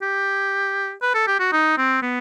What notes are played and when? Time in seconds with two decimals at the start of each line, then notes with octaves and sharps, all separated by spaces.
0.02 G4
1.02 B4
1.14 A4
1.27 G4
1.39 F#4
1.52 D#4
1.77 C4
2.02 B3